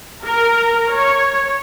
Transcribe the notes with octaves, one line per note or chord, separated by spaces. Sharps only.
A#4
C#5